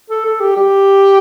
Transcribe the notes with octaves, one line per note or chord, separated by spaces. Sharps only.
A4
A4
G4
G4